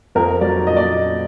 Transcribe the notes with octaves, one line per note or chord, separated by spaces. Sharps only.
F2 A#4
F#3 D5
A#2 D#5
D5